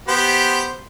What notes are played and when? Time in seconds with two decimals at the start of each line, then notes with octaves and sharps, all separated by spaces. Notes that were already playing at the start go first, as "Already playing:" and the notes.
0.08 B3 G4 C5